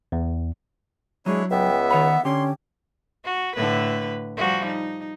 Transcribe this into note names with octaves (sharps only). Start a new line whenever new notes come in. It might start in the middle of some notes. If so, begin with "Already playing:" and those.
E2
F#3 G#3 D4 E4 C#5
C#2 B3 E5 G5
D#3 C#5 F#5 B5
D3 C#4 G4 C6
F#4
A2 D3 B4
F3 G3 F#4
D#4